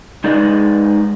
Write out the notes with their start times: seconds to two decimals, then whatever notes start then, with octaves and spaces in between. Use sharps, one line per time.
0.24 G#3 D#4 G#4 B4 D5 D#5